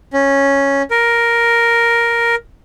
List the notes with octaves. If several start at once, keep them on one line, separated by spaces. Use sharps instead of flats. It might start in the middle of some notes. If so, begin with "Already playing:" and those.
C#4
A#4